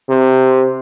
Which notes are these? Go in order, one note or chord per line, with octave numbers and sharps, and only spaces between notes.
C3